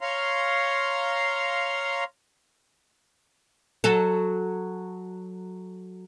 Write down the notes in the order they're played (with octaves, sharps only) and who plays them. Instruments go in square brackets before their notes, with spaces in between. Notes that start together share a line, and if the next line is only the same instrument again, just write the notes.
[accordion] C#5 F5 A#5 C6
[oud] F#3 F#4 A4